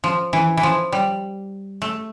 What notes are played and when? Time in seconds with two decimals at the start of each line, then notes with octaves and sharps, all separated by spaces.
0.04 F3
0.33 E3
0.57 E3
0.63 F3
0.92 G3
1.82 A3